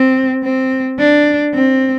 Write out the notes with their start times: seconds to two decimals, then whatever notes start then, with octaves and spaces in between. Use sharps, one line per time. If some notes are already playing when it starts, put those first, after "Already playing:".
Already playing: C4
0.44 C4
0.99 D4
1.54 C4